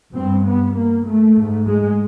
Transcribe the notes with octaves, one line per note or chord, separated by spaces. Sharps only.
G2 C4
B3
A#3
A3
G#2
G#3